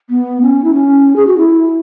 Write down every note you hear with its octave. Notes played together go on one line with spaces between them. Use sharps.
B3
C#4
E4
C#4
G#4
F#4
E4